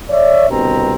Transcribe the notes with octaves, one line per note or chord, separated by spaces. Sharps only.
C#5 D5 E5
G1 C2 G2 B2 C4 A#5